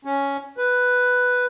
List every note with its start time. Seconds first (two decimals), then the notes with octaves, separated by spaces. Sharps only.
0.05 C#4
0.57 B4